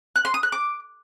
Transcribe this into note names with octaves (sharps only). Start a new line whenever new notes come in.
F#6
C6
D#6
F#6
D6